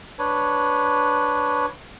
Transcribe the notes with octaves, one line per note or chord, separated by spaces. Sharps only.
D4 B4 C#5